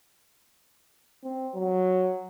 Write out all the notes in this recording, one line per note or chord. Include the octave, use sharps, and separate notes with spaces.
C4
F#3